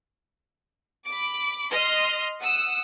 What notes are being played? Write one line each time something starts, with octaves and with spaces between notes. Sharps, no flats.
B5 D6
D#5 C6 F6
F#5 D#6 E6